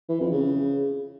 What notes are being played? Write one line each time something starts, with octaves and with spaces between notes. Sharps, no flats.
E3
F2
C#3